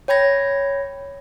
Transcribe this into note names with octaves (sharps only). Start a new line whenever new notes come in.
C#5 G5 B5 G#6 A#6